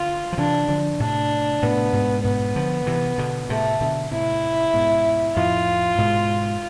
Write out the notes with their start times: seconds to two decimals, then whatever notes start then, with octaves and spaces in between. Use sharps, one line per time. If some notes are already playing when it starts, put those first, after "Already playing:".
Already playing: D3 F4
0.32 F3
0.37 C3 E3 D4
0.68 D3 F3
1.00 A2 C3 D4
1.62 A2 C3 B3
1.93 G#2 B2
2.24 G#2 B2 B3
2.56 D3 F3
2.86 C3 E3
3.18 B2 D3
3.49 A2 C3 A3
3.81 B2 D3
4.11 A2 C3 E4
4.74 G#2 B2
5.36 F2 A2 F4
5.98 G#2 B2